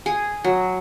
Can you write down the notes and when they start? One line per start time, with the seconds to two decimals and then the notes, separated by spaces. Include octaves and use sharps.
0.06 G#4
0.44 F#3